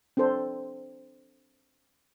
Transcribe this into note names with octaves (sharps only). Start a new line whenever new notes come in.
C4 D4 A4 C5